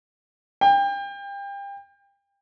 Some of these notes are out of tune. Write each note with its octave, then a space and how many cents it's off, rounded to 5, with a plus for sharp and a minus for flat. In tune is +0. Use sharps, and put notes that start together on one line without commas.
G5 +30